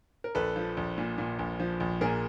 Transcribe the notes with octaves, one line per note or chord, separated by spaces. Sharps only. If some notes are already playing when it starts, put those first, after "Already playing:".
A#4
A#1 A4 B4
F3
A#1
A#2
A#2
A#1
F3
A#1
A#2 G#4 A#4